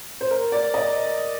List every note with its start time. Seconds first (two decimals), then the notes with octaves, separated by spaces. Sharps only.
0.21 C5
0.31 A#4
0.52 D5
0.74 D#5